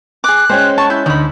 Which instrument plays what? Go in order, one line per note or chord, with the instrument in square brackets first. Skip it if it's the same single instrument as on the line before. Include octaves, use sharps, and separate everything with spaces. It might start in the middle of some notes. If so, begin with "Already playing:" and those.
[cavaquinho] G#4 D6 [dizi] F#6
[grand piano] G#3 C#4 C#5 [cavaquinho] C5 G5
[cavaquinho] A5 [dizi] C#6
[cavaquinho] E4 [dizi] G6
[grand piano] D2 [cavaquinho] D#4 B5